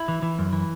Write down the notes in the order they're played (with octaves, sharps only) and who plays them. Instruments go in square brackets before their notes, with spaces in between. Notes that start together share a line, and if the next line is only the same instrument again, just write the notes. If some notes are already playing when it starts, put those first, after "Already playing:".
Already playing: [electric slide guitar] E4
E3
E3
F#2
E3